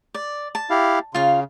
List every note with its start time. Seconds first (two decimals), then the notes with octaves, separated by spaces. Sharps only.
0.14 D5
0.55 A5
0.70 E4 G4 F5
1.15 C#3 F4 F5